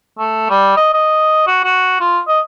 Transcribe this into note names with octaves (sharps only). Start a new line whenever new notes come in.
A3
G3
D#5
D#5
F#4
F#4
F4
D#5